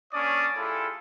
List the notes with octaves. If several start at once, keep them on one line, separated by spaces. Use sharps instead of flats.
A#3 C#4 D4 C#5 D5 D#6
G3 E4 F4 G#4 A4